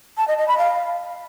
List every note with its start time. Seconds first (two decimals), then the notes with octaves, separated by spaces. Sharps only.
0.18 A5
0.28 D#5
0.38 D#5
0.48 B5
0.58 F5